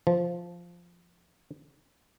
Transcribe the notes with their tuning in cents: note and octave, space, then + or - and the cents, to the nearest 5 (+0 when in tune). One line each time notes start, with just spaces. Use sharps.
F3 -5